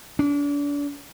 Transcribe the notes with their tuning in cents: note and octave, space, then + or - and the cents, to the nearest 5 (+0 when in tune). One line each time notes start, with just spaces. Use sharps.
D4 -35